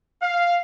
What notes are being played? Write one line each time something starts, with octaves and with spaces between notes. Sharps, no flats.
F5